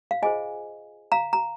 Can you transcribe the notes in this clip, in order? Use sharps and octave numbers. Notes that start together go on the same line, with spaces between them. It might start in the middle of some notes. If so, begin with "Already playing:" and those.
F5
F4 G#4 C5 D#5 G#5
F5 A#5
A#5